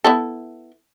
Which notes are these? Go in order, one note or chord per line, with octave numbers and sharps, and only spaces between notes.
B3 E4 A4